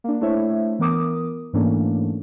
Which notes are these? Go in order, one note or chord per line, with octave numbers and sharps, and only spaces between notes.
A#3 D4
A3 D4 E4 C5 C#5 E5
E3 B3 A#4 D6 D#6
G#2 E3 A3 A#3 C#4 D4